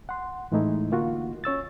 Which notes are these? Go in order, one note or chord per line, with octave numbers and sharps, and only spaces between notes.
F#5 C6
A2 E3 G#3 A3 D#4 E4
D3 A#3 F4 F#4
C#4 C#5 E6 A6